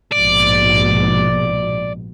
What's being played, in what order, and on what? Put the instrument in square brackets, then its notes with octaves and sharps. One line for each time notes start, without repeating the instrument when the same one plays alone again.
[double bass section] A#1 G#2 B2 [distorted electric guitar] D5